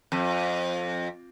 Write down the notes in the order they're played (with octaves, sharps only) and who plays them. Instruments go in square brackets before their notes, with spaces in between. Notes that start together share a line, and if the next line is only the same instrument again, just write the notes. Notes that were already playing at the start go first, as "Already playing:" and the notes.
[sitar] F2